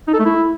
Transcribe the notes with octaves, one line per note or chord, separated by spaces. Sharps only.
D#4
A4
A3
E4